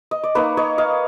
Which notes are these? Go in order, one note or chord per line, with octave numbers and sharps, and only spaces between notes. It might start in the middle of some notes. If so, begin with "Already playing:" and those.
D#5
D5
A#3 D#4 B4 C#5
C#5 D#5
D#5 F5